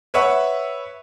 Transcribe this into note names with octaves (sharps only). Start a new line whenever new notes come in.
B4 C#5 E5 F#5 C#6